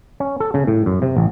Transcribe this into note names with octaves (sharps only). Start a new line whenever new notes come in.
C#4
A4
C#3
A2
F#2
C3
A1